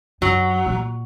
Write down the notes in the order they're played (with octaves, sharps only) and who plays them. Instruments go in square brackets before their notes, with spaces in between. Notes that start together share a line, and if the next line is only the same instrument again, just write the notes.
[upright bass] F#2 [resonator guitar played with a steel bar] F#3
[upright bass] A#2